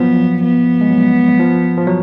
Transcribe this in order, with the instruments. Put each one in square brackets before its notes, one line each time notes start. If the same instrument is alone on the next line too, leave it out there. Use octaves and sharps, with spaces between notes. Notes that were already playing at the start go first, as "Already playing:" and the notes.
Already playing: [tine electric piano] F3 F#3 [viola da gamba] B3
[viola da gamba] B3
[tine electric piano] G#3
F#3
F3
F3
F#3